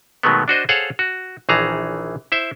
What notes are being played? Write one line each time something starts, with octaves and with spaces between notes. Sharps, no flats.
B2 D#3 F#3 G#3 A3 B3
D4 F#4 C5 D#5
G#4 A4 C5 C#5 F5 F#5
F#4
A#1 D#3 E3 G#4 A5 A#5
E4 C5 E5